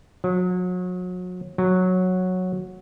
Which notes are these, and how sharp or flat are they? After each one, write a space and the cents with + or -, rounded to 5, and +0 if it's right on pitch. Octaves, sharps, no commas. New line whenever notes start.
F#3 -35
F#3 -10